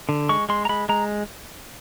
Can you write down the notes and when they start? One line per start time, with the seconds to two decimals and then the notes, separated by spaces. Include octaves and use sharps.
0.09 D3
0.29 G#3 C#6
0.49 G#3 C6
0.65 A#5
0.69 G#3 B5
0.89 G#3 A#5